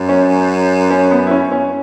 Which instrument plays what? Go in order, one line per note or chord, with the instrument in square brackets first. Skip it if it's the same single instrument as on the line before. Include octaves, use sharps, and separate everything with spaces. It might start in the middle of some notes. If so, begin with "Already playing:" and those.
Already playing: [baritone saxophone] F#2
[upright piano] C#4
C#4
B3
E4
C#4
C#4